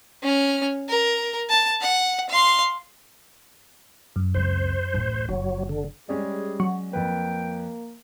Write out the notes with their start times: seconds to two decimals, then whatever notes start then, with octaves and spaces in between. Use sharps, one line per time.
0.23 C#4 F6
0.89 A#4
1.49 A5
1.81 F#5
2.29 F5 C6
4.16 F#2
4.34 C#2 C4 C5
4.93 A1 D2
5.29 F#1 F#3
5.69 D3
6.09 G3 G#3 C#4 G#4 D5
6.60 F#3
6.93 F2 A#3 B4 G5